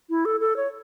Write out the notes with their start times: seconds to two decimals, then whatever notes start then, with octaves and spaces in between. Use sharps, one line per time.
0.10 E4
0.25 A4
0.40 A4
0.56 C#5